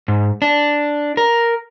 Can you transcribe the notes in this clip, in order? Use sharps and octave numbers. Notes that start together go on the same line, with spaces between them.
G#2
D4
A#4